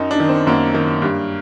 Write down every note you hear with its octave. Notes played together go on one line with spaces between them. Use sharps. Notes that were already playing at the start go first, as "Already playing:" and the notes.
Already playing: F#2 D#4
D4
D#3
C4
F#2 A#3
D#3
G2